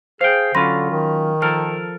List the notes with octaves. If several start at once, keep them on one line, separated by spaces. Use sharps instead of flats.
G#4 C5 F5 G5
D3 F#3 C#4 F4 B5 C6 A#6
D#3
F3 A4 A#4 F6